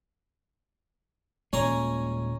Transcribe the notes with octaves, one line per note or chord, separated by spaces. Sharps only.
D#1 A#2 G#3 C#4 G#5 A#5